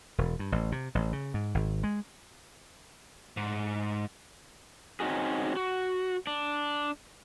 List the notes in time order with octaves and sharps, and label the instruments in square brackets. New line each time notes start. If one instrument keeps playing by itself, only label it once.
[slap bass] E1
G2
A1
C3
A1
C#3
G#2
G#1
G#3
[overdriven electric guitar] G#2
[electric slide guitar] C4 C#4 D#4 F#4 G#4
F#4
D4